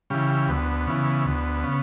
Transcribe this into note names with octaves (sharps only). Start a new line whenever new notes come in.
C#3 E3 G3
D2 B3
C#3 E3
D2
C#3